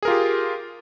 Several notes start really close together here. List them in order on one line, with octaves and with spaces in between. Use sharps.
G#4 A#4 F4 G4